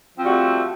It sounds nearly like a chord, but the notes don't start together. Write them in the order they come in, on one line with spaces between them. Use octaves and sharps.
F3 C4 F#4 G3 A3